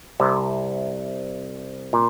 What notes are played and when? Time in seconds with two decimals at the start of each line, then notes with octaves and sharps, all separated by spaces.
0.20 C2 C3
1.93 A#2